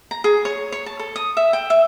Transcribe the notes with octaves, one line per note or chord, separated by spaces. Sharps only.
A#5
G#4
C#5
C#5
A5
A4
D#6
E5
G5
E5